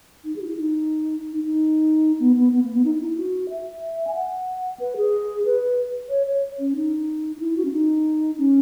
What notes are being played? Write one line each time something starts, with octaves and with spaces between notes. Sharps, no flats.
D#4
G#4
F#4
E4
D#4
D#4
D#4
B3
B3
B3
A#3
B3
D#4
D#4
E4
F#4
E5
G#5
F#5
B4
G#4
B4
C#5
C#5
C#4
D#4
D#4
E4
F#4
C#4
D#4
C#4